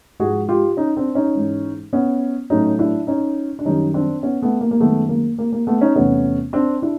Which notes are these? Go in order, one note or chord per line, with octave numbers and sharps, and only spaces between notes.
G#2 F3 G#3 F#4 G#4
F4 G4
C#4 D#4
C4 D4
C#4 D#4
G#2 E3 G#3
B3 C#4
A2 F#3 A3 C#4 D#4
D4 E4
C#4 D#4
D4
F#2 D#3 G3 C#4 D#4
C4 D4
B3 C#4
A3 B3
A#3
A#3
F#2 D#3 G#3 A3 B3
A#3
A#3
A#3
A3 B3
C#4 D#4
E2 C3 E3 A3 B3 C#4
C4 D4
D4 E4